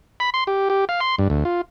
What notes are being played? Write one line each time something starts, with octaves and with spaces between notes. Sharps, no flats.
B5
C6
G4
G4
F5
C6
G2
D2
F4